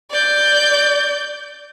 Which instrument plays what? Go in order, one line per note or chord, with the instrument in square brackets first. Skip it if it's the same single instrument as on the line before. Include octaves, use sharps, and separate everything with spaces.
[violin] D5 G6